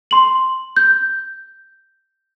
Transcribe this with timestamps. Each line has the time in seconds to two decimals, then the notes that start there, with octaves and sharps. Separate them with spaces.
0.11 C6 F#7
0.77 G6